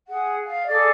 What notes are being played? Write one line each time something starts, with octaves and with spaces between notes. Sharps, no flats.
G#4 F#5
F5
G#4 A4 D5 D6